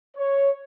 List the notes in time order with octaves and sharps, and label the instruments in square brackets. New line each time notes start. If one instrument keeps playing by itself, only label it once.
[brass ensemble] C#5